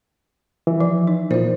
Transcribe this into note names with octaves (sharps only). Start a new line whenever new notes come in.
E3
F3
D#4
A#2 F4 C5